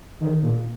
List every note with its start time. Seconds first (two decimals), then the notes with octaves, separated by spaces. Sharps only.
0.20 D#3
0.43 A#2